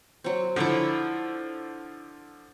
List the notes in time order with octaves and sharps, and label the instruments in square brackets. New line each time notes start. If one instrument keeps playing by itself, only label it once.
[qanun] F#3 C4
[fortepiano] D3 F3 [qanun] E4 C#5 D6